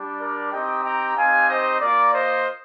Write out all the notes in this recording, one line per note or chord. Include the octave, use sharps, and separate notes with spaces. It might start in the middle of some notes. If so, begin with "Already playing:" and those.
Already playing: G3 D4 G4
A#4 D5
C4 D#4 G4 D#5 G5
G5 A#5
C4 D#4 G4 F5 G#5
C5 D#5
A#3 F4 A#4 D5
C5 D#5